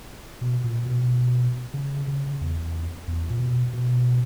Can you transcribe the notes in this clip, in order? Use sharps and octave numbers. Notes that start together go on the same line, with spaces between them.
B2
A#2
B2
C#3
C#3
E2
E2
A#2
B2
B2